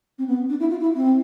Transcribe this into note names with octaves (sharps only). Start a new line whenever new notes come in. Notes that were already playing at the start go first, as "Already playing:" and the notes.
C4
B3
D4
E4
F4
E4
C4